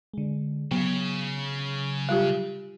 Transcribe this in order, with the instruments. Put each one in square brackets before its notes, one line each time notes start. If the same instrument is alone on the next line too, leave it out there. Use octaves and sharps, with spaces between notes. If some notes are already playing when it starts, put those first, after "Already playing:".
[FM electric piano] D3 G#3
[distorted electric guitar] C#3 [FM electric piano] F#3 [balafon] B3
[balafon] G3 F4 G4